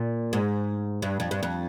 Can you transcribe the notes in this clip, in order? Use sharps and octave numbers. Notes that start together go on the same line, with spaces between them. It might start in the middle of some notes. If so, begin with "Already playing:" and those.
Already playing: A#2
G#2
G2
F2
G2
F2